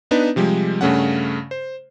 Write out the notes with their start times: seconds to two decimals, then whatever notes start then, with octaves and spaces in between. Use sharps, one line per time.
0.11 B3 D4 D#4 B4
0.36 C3 F3 G3 G#3
0.81 G2 C#3 A3 C#4 F#5
1.51 C5